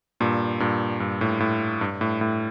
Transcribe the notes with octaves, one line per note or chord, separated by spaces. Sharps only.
G2 A#2
G2 A#2
G2
A2
A2
G2
A2
A2